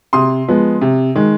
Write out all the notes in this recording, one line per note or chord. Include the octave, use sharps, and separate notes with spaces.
C3 C6 D#6
F3 G#3 B3
C3
D#3 G#3